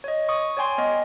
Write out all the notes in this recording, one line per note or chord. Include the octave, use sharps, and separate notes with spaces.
C#5 D#5
C#6 D#6
C#5 D5 G5 G#5 C6
B3 D#5